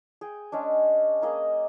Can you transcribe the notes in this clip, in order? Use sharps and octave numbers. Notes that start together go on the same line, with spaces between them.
G#4 G5
G#3 C#4 D4
A#3 G#4 D#5